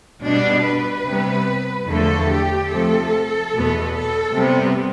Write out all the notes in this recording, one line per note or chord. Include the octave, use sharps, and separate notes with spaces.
B2 G3 B3 D4
B4
C3 G3 B3
E2 D3 F3 A3 A4
G4
C3 F3 A3 A4
E2 B2 B3
A4
C3 G3 B3